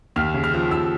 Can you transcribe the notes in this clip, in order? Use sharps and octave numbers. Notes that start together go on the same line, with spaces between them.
D#2 F6
C#3
F6
F3
D#2 E6